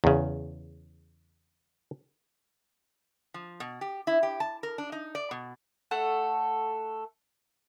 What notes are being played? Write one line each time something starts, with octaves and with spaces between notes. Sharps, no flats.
E2 C#3
F3
B2
G4
E4
G4
A5
A#4
D4
D#4
D5
B2
A3 A4 F#5